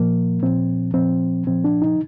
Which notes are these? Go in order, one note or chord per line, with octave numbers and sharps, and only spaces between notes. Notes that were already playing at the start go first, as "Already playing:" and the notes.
Already playing: A#2 F3 A#3
A#2 F3 C4
A#2 F3 C4
A#2 F3 C4
D4
D#4